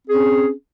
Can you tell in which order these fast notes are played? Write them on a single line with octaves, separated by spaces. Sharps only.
C4 G#4 C#4